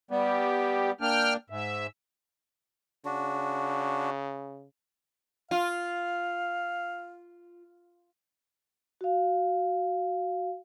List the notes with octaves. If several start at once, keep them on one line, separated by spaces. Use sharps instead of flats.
G3 B3 G4
A#3 D4 G5 F6
G#2 E5
C#3 D4 F#4
F4 F5
F#4 F5